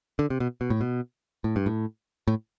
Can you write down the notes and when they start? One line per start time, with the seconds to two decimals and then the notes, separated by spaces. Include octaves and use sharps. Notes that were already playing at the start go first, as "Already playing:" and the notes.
0.19 D3
0.30 C3
0.40 B2
0.61 B2
0.70 A2
0.81 B2
1.44 A2
1.56 G2
1.66 A2
2.28 A2